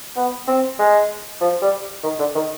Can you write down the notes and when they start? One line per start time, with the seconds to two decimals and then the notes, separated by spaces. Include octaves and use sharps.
0.17 B3
0.48 C4
0.79 G#3
1.41 F3
1.62 G3
2.04 D#3
2.19 D3
2.35 D#3